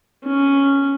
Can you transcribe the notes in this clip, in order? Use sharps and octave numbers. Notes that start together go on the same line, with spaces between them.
C#4